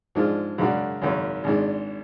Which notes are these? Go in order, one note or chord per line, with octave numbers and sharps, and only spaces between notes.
G#2 F3 G#3 D4 F4
F#2 C#3 G#3 D4 F#4
G#1 F#2 C#3
G#1 G#2 G#3 D4